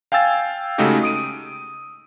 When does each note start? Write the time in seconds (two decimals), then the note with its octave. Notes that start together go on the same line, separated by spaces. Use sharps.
0.12 F5 G5 G#5 E6 A6
0.78 C#3 G#3 A3 D#4 F#4 G4
1.03 D#6 D7 D#7